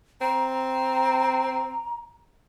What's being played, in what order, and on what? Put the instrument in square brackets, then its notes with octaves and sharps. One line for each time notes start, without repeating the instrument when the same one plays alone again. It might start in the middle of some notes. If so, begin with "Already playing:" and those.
[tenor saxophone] C4 [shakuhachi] A#5